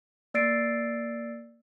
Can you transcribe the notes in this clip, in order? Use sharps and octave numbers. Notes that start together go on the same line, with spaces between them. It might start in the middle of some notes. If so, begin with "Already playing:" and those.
A#3 D5 E6 A6 C7 D7